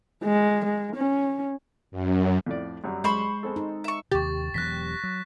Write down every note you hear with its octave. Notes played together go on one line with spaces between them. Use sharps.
G#3
G#3
C#4
F#2
F2 A2 D5
F#2 F#3 G3
G#3 C5 B5 C#6
G#3 C4 A4
D#4
E5 C#6
D#2 C3 G4 C#6 A6
E1 E3 F#3 F#6 A#6 B6
F#3